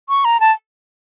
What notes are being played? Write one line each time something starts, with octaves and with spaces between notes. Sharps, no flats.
C#6
A#5
A5